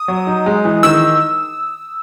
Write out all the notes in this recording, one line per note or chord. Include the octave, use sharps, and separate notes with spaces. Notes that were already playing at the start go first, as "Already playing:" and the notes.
Already playing: D#6
F#3
D#4
G#3
E3
D#3 E6